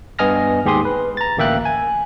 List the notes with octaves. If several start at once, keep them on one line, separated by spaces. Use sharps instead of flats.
G2 B3 D#5 G#5 F6 A#6
D#2 G#2 G4 G#4 C6 D#6
B4
A#5 A6
A1 D2 A#3 E5 G5 F#6
G#5